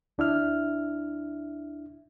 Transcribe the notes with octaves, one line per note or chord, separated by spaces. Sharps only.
D2 D4 E4 E5 F6